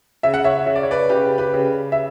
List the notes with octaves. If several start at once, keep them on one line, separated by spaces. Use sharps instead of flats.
C#3 E5
F#5
C#5 E5
C#3 E5
D5
C#5
B4 D5
C#3 G4 B4
G4 B4
C#3
E5